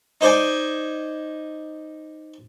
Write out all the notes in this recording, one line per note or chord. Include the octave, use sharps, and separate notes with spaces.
D#4 C5 D5 G#5